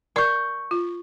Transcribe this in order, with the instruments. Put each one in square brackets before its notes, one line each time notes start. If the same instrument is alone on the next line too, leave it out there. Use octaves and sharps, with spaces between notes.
[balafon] A#4 D5 [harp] C#6 G6
[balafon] F4